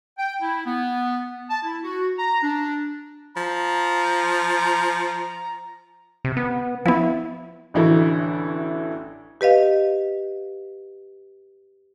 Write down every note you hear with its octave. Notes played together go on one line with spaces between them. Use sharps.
G5
E4
B3
A5
E4
F#4
A#5
D4
F3 A#5
C3
B3
F3 B3 E4
A1 D3 E3 E4 F#4 A4
G4 B4 D#5 F5